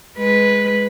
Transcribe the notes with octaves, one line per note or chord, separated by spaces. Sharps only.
G#3 B4